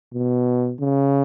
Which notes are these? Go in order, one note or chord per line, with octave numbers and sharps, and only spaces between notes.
B2
C#3